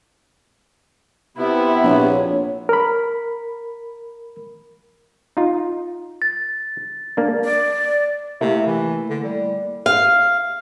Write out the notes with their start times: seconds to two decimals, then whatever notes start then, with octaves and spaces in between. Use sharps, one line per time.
1.37 C3 B3 E4
1.84 A#1 C#5
2.69 A#4 B5
5.37 D#4 F4
6.22 A6
7.17 A#3 D4
7.44 D5
8.41 C3 A3 A#3 E4
8.66 E3
9.10 D3
9.24 G3
9.86 F5